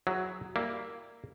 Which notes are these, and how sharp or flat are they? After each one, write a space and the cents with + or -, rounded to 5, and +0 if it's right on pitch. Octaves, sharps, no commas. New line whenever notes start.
F#3 +0 E4 +0 G#4 +0
G3 +0 A#3 -5 E4 +0